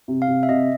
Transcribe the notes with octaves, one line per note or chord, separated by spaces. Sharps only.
C3
F5
C3
E5
C3 D#5